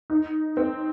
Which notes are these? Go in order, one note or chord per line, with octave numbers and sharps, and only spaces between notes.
D#4
C4